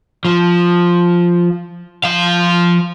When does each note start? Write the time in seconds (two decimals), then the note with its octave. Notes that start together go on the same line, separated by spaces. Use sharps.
0.25 F3
2.04 F3 F5